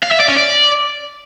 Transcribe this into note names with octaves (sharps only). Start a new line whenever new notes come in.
F5
E5
D5
C#4
D5